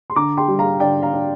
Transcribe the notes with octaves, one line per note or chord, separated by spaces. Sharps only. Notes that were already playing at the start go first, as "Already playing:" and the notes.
C6
D3 A#5 D6
G5 C6
G3
F5 A#5
D3 D5 G5
F5 A#5
D4